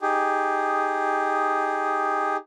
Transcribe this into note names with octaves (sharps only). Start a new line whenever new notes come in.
D#4 G4 G#4